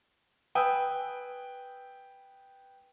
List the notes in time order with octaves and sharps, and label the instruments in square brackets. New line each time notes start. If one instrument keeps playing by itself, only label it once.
[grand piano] B4 G5 G#5 D#6 E6